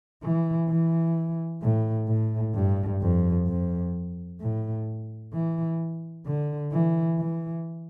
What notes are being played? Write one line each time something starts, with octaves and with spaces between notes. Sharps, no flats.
E3
E3
A2
A2
G2
F2
F2
A2
E3
D3
E3
E3